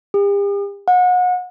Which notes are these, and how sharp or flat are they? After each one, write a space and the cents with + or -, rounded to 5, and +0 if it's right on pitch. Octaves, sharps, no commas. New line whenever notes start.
G4 +45
F#5 -35